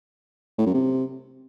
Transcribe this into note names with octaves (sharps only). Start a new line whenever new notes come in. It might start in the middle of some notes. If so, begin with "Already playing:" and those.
A2
F#2
C3